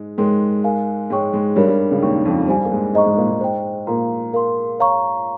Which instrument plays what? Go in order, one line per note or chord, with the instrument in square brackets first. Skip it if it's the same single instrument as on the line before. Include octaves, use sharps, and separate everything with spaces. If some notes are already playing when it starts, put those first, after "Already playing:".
Already playing: [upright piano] G#2 G#3
[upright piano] G#2 G#3 [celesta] A#4 C#5 G5 C6
[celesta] A#4 F5 G#5
[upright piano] G#2 G#3 [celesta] D#4 G#4 C#5 G5 C#6
[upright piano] G#2 G#3
[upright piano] G2 G3 [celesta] D#4 A#4 C#5
[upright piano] G2 G3
C#2 C#3
[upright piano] D#2 D#3 [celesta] C#5 G5 C#6
[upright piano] F2 F3
[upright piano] G2 G3 [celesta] C5 F5 G#5
[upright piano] A#3
G#2 G#3
[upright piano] G#2 G#3 [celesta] C5 D#5 A#5 C#6
[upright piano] G#2 G#3
A#2 A#3
G#2 G#3
[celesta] C5 D#5 G5
[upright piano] A#2 A#3 [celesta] A#4 F5 A#5
[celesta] A#4 F5 C6
C#5 F5 A#5 C#6